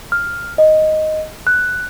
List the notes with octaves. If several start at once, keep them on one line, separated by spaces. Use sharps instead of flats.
F6
D#5
F#6